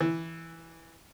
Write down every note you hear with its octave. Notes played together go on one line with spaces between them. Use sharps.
E3